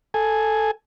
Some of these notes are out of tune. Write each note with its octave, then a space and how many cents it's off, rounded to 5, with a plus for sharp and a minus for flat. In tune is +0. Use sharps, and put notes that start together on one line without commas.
A4 +0 G#5 +0